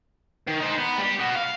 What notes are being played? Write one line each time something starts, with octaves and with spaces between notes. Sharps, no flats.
D#3
D#4 C5
B3
G3 G4
B3 F#4
F5